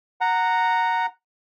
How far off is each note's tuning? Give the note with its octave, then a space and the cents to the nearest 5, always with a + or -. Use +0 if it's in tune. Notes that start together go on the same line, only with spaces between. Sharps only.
F#5 +0 A#5 -10